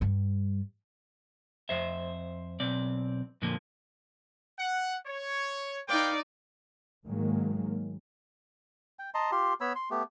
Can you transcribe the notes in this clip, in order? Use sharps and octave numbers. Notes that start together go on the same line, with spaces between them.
G2 G3
F2 C5 E5
B1 C4 D5
F2 A#2 D3 F3 A#3
F#5
C#5
D#4 B4 D5 F5 G5
G#2 D#3 F#3 G#3 A#3
G5
D#5 A5 A#5 C6
F4 G4 C6
B3 C#5 B5 E6
C6
A3 B3 G4